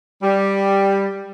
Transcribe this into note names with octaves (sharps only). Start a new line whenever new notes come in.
G3